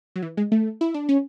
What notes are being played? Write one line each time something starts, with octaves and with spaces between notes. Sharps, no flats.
F#3
E3
G#3
A3
E4
D4
C#4